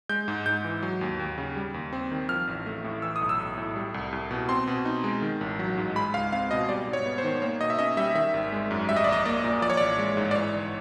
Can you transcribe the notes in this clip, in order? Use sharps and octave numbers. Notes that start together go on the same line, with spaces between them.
G#3 G6
G#2
G#2 G6
E3
F#3
D#2
D#2
C#3
G3
D#2
C4
D#3
F3 F6
A1
A3
A2
E3 E6
D#6
B1
E6
B1
A2
G3
C2
C2
B2
C4 C6
B2
D#4
G#3
D#3
A1
F#3
G#2
G#3 B5
C#2 F5
C4 F5
B2 D#5
G3 D5
G#2
C#5
B3
C5
D#3
A#3 C#5
B2 D#5
E5
C#4 D#5
G3 E5
D#3 E5
G#1
G#3
F#2
G3 E5
D#5
A#1 D5
D#5
A#3 D5
A#2
F3 D5
C#5
A1 D5
G#3
G#2
D5
E3 C#5
G1